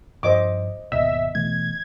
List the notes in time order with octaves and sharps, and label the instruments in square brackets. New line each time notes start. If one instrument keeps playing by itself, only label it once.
[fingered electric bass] G2 F3 [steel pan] C5 D#5 D6
[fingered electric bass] G#1 D#2 B2 [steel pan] D#5 [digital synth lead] E5
[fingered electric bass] B2 E3 A3 [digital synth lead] G#6